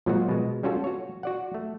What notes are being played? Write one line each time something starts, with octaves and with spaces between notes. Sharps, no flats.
A#2 F3 F#3 G#3 F4 F#4
B2 G#3
G3 C#4 F4 F#4 A4
F#4 C#5
F#4 D5 F#5
A3